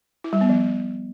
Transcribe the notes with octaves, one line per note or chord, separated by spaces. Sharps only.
E4
G3
B3
F3